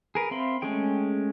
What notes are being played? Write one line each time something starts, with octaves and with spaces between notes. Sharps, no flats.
G#4 A#4 B4
C4 E5 F5 B5 C6
G#3 A3 C#4 G#4 G5